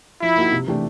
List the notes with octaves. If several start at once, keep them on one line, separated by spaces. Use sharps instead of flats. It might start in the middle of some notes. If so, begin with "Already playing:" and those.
F3 E4
A#3 D#4 F#4
C3
E3 A3 D4 G4